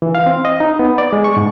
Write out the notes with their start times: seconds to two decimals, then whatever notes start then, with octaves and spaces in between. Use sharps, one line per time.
0.02 E3
0.15 F5
0.26 C4
0.45 D#5
0.60 D#4
0.79 B3
0.98 D5
1.13 G#3
1.24 C#6
1.37 G#2